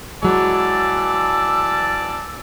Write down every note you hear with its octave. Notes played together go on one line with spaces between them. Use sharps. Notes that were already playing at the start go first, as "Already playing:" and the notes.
E3 F#3 G#3 D5 A5 E6